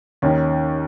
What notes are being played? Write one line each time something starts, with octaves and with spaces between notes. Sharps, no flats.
D#2 D#3 C#4